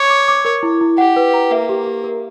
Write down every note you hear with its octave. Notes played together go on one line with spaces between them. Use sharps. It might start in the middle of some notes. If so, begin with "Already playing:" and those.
Already playing: C#5 D6
D6
D6
A#4
E4
E4
G4 F#5
B4
A#5
A#3 E5
G4
G4
A#4